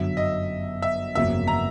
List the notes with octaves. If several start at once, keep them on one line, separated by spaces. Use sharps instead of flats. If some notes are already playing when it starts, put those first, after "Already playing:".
Already playing: G1 F#2 D3 F#3 E5
D#5
E5
G1 F2 C#3 F#3 A#3 E5
A#5